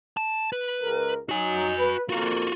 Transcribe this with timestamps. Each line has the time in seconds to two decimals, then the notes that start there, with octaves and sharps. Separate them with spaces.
0.17 A5
0.53 B4
0.82 C#2 A#4
1.29 F#3 D#4 F#4 G#5
1.78 B4
2.09 F2 A#3 F4 F#4